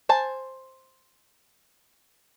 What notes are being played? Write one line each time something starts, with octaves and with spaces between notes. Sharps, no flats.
C5 G#5 A5